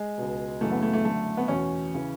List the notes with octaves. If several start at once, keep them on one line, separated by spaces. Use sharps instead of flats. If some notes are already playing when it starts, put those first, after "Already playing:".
Already playing: G#3
C#2 B2
F#2 C#3 E3 A3
B3
A3
A3
F#2 D3 A3
B3
E2 B2 C#4
C#3 E3